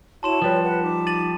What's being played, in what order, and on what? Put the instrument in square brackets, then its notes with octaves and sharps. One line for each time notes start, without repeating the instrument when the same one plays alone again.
[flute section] E4 F#4 C#5 [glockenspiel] A5 C6 E7
[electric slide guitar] F3 G3 [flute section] B4 C#5 G5
[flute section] B4 F#5
D#4 D6
[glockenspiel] A6 D#7 F#7